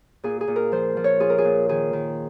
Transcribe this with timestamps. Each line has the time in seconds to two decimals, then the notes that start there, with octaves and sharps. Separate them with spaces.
0.23 A#2 G#4
0.41 G#4
0.48 A#2
0.56 A#4
0.72 F3 C5
0.97 F3
1.04 C#5
1.20 F4 G#4
1.30 A#4
1.38 G#4
1.44 A#2
1.69 D#3 G#4
1.93 D#3